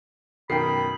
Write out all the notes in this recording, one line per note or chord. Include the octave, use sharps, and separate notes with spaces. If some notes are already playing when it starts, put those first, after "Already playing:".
F#2 B2 D#3 G5 B5 C7